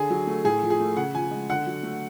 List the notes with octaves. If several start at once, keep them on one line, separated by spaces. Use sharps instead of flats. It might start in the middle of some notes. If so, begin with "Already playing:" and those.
Already playing: D3 G#4
F#3
A3
A2 G#4
F3
G#4
A3
C#3 F#5
F3 G#5
G#3
D3 F#5
F#3
A3